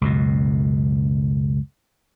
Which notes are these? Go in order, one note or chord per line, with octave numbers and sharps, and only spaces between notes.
C#2 F#2 B2